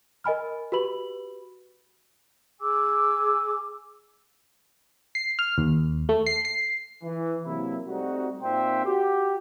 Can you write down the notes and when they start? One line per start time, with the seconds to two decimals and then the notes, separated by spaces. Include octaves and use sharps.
0.24 A#4 D#5 G#5 B5 F6
0.72 F#4 G4 B4 B5 F#7
2.60 G#4 G#5 D6 E6
5.15 C7
5.39 F6
5.58 D#2
6.09 A3
6.26 C7
6.45 C7
7.04 E3
7.45 C3 F#3 A#3 E4
7.88 G3 A3 C4 D#4 F#4
8.42 A#2 C4 D#4 C5 E5 G5
8.85 F#4 G4